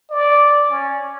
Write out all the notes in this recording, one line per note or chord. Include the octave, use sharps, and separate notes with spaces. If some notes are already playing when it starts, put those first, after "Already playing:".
D5
C#4